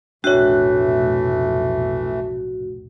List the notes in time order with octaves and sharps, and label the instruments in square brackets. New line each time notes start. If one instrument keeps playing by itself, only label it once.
[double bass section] F1 B1 A2 [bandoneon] E3 A3 [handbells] D4 C#5 [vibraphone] F#4